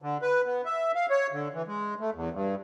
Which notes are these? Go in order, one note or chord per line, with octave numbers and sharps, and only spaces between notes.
D3
B4
B3
E5
F5
C#5
D3
E3
G#3
A3
E2
G2